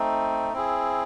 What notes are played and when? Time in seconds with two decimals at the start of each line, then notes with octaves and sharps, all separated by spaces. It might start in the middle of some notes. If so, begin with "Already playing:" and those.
Already playing: A3 C4 D#4
0.53 C4 E4 G#4